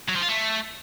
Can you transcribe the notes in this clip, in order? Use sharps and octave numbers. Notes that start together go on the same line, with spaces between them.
F#3
F3
F4
A3